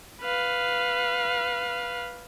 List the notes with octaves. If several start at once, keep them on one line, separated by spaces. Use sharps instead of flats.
B4 F5